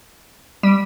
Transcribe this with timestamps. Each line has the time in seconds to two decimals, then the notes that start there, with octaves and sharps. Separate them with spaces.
0.63 G3